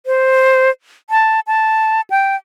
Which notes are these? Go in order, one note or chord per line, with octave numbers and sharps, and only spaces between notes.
C5
A5
A5
G5